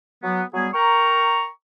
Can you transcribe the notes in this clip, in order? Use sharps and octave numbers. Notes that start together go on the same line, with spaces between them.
F#3 B3
F#3 G3 B3 G#4
A#4 G5 A#5 C#6